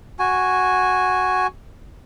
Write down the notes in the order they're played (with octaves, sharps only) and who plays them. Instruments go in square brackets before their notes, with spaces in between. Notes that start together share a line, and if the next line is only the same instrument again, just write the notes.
[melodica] F#4 G#5